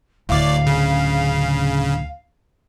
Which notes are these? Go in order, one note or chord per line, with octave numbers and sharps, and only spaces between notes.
D1 D2 A2 D5 F5
C#3